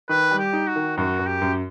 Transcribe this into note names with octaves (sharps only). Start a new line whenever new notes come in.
D#3 B4
G3
G4
D#4
F#4
D#3
F#2 F#4
F#2
G4
F#2